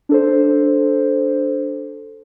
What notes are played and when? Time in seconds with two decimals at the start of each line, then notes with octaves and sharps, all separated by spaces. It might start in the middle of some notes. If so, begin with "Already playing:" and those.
0.09 D4 A4 C5